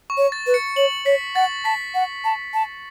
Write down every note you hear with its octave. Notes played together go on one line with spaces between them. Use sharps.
C#6
C#5
A6
B4
C#7
C#5 F#7
C#5 B6
F#5 A6
A5 B6
F#5
A5
A5